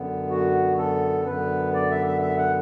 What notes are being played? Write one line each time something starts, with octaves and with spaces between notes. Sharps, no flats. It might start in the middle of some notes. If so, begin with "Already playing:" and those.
Already playing: F#2 D3 B3
F#4
A4
F#2 D3 B3 B4
D5
E5
E5
E5
F#5